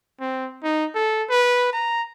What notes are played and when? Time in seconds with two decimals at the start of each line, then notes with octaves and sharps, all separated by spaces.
0.20 C4
0.63 D#4
0.95 A4
1.29 B4
1.73 A#5